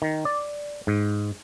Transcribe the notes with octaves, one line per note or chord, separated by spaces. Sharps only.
D#3
D5
G#2